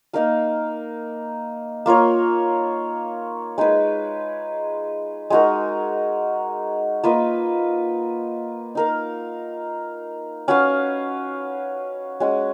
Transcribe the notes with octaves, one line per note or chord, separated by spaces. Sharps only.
A#3 D#4 A#4 F5
A#3 F4 A#4 C#5
G#3 D#4 G#4 B4
G#3 D#4 F#4 A#4
A#3 F4 B4 D#5
D#4 A#4 F5
C#4 F#4 B4 F5
G#3 C#4 F#4